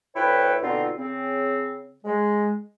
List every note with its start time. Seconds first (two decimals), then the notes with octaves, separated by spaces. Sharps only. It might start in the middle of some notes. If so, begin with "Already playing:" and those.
0.15 D2 E4 B4 C#5 G5
0.62 B2 D3 C4 D#4 F4
0.97 C#3 C4
2.04 G#3